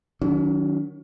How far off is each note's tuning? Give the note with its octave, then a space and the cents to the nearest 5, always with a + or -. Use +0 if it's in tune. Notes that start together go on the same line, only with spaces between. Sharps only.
D#3 +0 F#3 +0 C#4 +45